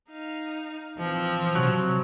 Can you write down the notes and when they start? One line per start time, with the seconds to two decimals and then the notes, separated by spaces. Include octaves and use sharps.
0.10 D#4 F5
0.98 E3 F3 C4
1.55 C3 F#3